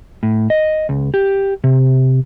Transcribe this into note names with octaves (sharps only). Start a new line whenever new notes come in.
A2
D#5
C#2
G4
C3